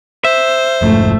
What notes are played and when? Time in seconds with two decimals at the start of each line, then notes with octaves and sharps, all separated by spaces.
0.24 C5 E5
0.82 F1 G#2 F3 A3